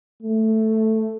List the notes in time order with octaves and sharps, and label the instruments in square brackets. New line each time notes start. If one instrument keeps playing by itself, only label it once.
[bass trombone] A3